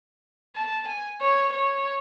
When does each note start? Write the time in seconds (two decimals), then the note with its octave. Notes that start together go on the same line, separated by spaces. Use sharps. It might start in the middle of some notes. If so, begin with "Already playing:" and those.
0.56 A5
0.87 G#5
1.21 C#5
1.53 C#5